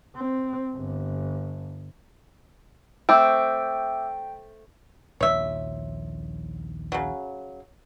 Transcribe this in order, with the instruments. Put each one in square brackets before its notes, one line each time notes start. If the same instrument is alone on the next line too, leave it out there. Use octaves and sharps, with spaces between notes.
[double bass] C4
G1
[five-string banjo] A3 C4 [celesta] E5 D6 E6 [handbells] G5
[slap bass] A#1 D#2 F3 [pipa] C#5 E5
[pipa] C#3 F#3